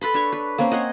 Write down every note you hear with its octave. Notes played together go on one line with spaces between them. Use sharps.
A4 B4 B5 C6
D4 C#5 C#6
B4
A#3 C4 C#4
D#5 F#5 G#5 C6